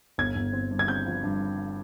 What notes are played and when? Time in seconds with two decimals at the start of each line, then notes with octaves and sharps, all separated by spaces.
0.18 G1 G#6
0.35 G1
0.53 C4
0.71 G2
0.79 G#6
0.88 C4 G6
1.06 F3
1.24 G2